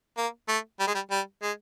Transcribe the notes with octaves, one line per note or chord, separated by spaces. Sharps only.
A#3
A3
G3
G#3
G3
G3
G#3